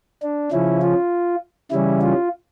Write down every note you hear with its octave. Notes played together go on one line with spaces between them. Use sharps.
D4
C#3 F3 C#4 E4
F4
C#3 E3 G3 C#4 E4
F4